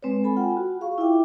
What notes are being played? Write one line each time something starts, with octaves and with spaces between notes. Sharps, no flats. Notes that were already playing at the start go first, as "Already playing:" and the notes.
G#3 C4 B4 C#5
A4 G#5 B5
F4 F#5 G5
F#4
G#4 F5 C#6
E4 F4 E5 G5 D6